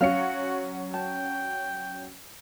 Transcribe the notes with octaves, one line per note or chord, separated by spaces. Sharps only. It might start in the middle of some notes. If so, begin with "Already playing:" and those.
F#3 C#4 F#4 F5 C#7
G5 A5